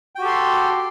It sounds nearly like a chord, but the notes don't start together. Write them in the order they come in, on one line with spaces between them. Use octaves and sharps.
G5 F#4 G4 A4 C6